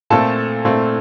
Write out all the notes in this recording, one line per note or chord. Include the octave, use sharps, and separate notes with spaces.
A#2 A3 C4 A4 A5
A#2 A3 C4